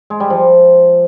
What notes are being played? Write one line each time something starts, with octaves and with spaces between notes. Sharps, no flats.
G#3
G3
F3